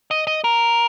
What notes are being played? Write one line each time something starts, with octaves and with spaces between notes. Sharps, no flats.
D#5
D#5
A#4